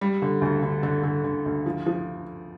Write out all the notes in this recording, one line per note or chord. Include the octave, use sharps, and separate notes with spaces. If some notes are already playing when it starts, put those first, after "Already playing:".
G3
D3
D2
D3
D3
D3
D3
D2
F3
F3